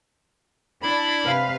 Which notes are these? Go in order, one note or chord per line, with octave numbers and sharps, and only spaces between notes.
D4 E4 B5
C3 B4 F5